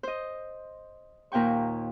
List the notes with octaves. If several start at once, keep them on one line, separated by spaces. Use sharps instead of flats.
C5 D#5
D#2 A#2 C5 G5 C#6